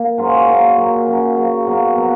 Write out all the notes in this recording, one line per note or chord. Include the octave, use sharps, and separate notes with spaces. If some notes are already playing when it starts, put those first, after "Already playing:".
Already playing: A#3
G#2 F#3 C#4 F4
A#2 F#3 A#3
A#2 F#3 A#3
C#3 F#3 C#4
C#3 F#3 C#4
B2 F#3 A#3
B2 F#3 A#3